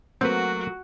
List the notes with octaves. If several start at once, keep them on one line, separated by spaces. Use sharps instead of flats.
F#3 A3 A#3 C4 F#4 B4